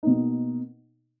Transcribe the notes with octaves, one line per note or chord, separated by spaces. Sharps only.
B2 A#3 D#4